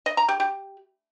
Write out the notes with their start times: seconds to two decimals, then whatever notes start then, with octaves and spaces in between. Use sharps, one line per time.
0.06 D#5
0.17 A#5
0.29 G4
0.40 G4